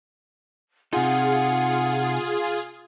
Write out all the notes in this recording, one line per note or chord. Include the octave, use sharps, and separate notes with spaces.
C3 D#4 F4 G#4 F#5